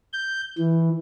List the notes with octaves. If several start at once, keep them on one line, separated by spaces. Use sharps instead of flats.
G6
E3